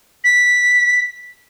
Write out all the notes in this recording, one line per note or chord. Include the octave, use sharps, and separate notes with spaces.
B6